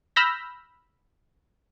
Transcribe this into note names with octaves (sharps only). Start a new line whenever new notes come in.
B5 E6 F6 G6 A#6 B6